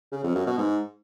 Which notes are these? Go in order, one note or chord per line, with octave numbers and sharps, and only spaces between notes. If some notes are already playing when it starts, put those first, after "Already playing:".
C#3
F2
F#2
B2
G#2